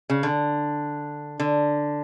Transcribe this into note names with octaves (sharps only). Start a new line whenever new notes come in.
C#3
D3
D3